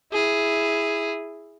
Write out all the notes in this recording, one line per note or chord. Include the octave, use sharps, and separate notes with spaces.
E4 G#4